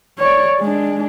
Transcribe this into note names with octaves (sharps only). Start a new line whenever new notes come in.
C#5 D5
G#3 D4